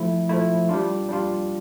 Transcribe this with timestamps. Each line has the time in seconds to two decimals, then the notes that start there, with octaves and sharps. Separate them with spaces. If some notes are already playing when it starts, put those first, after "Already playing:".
Already playing: F3 A3 E4
0.29 F3 A3 E4
0.69 G3 D4 F4
1.09 G3 D4 F4